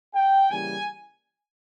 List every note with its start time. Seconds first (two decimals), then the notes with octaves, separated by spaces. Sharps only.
0.15 G5
0.50 C#3 E3 G3 A#3 G#5